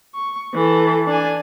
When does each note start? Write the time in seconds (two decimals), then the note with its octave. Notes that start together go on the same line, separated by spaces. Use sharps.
0.14 C#6
0.54 E3 A4
1.07 D4 G#5